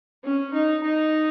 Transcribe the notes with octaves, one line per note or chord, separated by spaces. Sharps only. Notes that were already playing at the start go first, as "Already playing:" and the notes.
C#4
D#4
D#4